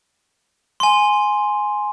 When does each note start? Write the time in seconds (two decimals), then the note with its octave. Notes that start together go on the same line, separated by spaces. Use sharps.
0.80 G#5 C6